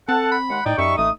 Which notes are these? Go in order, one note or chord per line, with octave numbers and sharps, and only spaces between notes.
C4 A4 F#5 A5
B5
D#2 G#3 F#5
A2 D#4 D5 G5
F#2 G3 D#4 E5 C#6
A1 A3 D#6